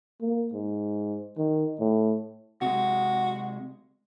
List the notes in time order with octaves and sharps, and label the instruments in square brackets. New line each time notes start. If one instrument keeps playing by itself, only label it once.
[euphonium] A#3
G#2
D#3
A2
[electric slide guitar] C3 G#3 [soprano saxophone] F#4